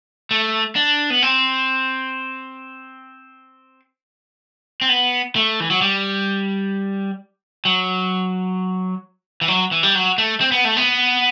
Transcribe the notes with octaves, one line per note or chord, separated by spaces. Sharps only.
A3
D4
B3
C4
C4
B3
A3
E3
F#3
G3
F#3
E3
F#3
E3
G3
F#3
A3
C4
B3
A3
B3